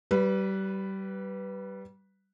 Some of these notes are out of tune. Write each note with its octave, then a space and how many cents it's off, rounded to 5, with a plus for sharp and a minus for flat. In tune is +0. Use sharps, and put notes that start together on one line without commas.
G3 -25 B4 +0